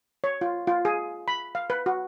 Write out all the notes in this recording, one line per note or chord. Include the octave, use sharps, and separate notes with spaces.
C#5
F4
F4
G#4
B5
F5
B4
F#4